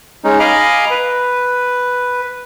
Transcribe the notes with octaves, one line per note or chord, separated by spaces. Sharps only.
G#3 C#4 D#4
D#5 F5 G#5 A#5 B5 D6
B4